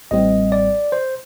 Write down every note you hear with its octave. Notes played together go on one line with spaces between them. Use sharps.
A1 A2 G3 C4 D#5
D5
C5